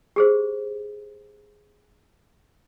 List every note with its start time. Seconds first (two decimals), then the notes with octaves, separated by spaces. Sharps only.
0.16 G4 G#4 C5